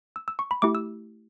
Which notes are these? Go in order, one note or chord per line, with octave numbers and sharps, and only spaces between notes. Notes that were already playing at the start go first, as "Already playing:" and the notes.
E6
E6
C#6
B5
A3 E4 G4 D6
E6